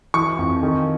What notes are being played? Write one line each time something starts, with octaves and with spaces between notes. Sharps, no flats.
E3 C#6
F2
D#3